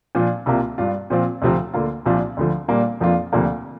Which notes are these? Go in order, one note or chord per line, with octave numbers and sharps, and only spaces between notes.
A#2 F3 D4 F4
C2 C3 A#3 F4
G2 G3 D4 F4
A#2 F3 C4 F4
D2 C3 F3 C4
D2 D3 A#3 F4
C2 A#2 F3 D4 F4
D2 D3 F3
A#2 G3 A#3 D4
F2 F3 A#3 D4 F4
D2 C3 F3 A#3 D4